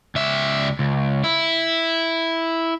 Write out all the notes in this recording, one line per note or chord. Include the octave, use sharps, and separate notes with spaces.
C#2 E5
C#2
E4